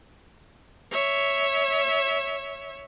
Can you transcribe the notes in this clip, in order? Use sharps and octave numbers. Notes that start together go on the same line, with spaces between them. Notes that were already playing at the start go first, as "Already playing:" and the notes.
C#5 E5